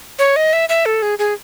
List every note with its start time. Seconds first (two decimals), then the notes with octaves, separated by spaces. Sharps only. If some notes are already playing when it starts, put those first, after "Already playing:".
0.19 C#5
0.36 D#5
0.53 E5
0.69 E5
0.86 A4
1.02 G#4
1.19 G#4